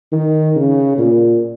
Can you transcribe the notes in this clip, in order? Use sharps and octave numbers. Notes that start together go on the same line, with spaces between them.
D#3
C#3
A#2